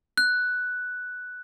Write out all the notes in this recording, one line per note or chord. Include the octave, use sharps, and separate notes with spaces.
F#6